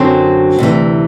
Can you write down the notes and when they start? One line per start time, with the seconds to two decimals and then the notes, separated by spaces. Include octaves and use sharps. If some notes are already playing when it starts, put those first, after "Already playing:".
Already playing: F#2 D3 F#3 C4
0.59 D2 C3 E3